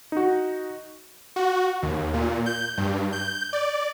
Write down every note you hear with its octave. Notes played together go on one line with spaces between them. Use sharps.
D#4 F#4
F#4
D#2
A#2
G6
G2
G6
D5